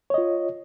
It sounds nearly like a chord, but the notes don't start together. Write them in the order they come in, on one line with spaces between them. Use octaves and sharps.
C#5 D#5 F4